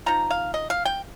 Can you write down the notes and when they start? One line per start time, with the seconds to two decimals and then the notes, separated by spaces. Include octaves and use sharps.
0.06 F3 D#4 A#5
0.30 F5
0.54 D#5
0.70 F5
0.85 G5